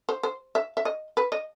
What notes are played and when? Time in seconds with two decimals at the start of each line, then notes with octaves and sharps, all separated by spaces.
0.09 C5
0.23 C5
0.55 E5
0.77 E5
0.85 D#5
1.17 B4
1.32 D#5